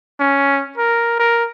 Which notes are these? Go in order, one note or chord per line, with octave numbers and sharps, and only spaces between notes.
C#4
A#4
A#4